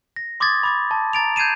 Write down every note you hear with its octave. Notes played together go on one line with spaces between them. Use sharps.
A#6
C6 D6 D#6 G#6 A6
B5 D6 A6
A5
A#5 A6 D7 F7
G6 G#6 C7 D#7 E7